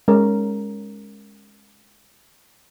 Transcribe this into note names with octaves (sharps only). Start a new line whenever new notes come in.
G#3 C#4 A#4